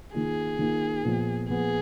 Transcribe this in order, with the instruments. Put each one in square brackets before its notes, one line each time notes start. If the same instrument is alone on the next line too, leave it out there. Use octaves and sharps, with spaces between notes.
[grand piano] D#3 A#3 F4 [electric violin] G#4
[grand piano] D#3 A#3 F4
A#2 F3 B3
[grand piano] A#2 F3 B3 [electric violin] G#4